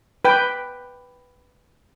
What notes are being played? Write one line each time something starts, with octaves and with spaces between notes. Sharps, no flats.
B4 G5